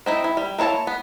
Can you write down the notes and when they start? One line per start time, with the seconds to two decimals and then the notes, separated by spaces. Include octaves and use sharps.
0.06 C4 D#4 E4
0.24 E4
0.37 G3
0.59 A#3 E4 C#5 A5
0.87 B3